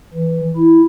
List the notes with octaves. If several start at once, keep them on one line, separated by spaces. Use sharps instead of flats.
E3
E4